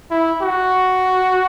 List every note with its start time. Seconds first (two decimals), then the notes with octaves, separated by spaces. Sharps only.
0.11 E4
0.42 F#4